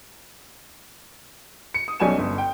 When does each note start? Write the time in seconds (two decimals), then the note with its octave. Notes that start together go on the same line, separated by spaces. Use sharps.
1.74 C#7
1.88 D#6
2.00 B1 G3 C#4 G#5 C#6 E7
2.18 G1
2.38 G5